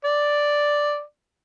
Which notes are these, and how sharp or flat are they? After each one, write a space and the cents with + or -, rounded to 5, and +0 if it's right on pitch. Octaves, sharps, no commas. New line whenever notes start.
D5 +0